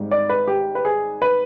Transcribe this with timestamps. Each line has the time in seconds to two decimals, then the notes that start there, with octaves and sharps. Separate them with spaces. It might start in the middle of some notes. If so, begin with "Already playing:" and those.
Already playing: G#1 G#2 G3
0.11 D5
0.29 B4
0.47 G4
0.75 B4
0.85 G#4
1.22 B4